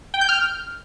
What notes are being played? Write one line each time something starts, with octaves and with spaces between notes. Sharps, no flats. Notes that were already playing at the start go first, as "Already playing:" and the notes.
G5
G6
F6